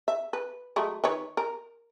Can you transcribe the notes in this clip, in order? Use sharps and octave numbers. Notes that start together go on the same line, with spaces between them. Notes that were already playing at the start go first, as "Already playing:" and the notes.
E5
B4
F#3 G#3 A3
D#3 B4 C#5
A#4